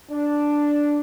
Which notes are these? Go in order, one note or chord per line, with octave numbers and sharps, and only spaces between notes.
D4